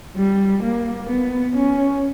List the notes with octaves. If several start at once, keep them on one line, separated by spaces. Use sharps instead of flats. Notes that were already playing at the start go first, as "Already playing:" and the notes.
G3
A#3
B3
C#4